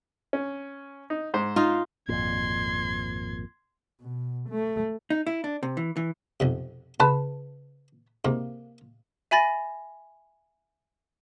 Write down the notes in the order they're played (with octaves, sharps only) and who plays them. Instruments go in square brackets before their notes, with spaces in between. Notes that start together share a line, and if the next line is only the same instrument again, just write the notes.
[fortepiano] C#4
D#4
G#2 C5
[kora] D#4 F4
[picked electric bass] G#1 F2 A#2 [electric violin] C6 G#6
[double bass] B2
A3
[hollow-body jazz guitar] D#4
E4
D4
C3
E3
E3
[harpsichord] B1 F2 C3
[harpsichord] C#3 [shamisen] B4 A5 B5
[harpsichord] G#2 C3 [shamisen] A#3
[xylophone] E5 G#5 B5 A6 A#6